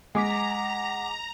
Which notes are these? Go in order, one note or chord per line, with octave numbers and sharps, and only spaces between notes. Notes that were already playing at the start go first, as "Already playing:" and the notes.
G#3 F#5 G#5 A#5 D6 B6